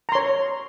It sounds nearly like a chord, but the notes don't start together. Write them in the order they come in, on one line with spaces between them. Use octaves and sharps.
A#5 C6 C#5